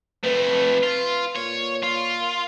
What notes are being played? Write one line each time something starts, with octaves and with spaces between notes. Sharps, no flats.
F2 A3 B4
F4
A#2 C#5
F4